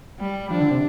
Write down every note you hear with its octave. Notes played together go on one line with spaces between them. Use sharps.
G3
F3 D4
D3
C3